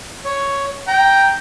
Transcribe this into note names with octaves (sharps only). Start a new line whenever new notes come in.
C#5
G5 A#5